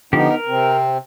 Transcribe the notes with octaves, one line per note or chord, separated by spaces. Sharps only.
D3 F3 B3 D#4 G4
A#4
C3 C4